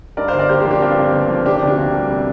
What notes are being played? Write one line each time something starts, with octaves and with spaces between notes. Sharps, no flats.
G2 A#4 D5
C5 F5
G1
A#4 D5
A#3 G4 C5
G4 C5
F3
D4 G4
G2 C4 F4
G1
A#3
F3
C3 D4 G4
D4
D2
D4 G4
A#3
G3
C3